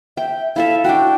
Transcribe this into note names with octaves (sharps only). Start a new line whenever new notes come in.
E5 G5
E4 A4 E5 F5
D4 F#4 G5